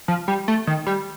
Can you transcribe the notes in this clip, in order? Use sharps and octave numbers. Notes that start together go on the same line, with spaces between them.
F3
G3
A3
D#3
G3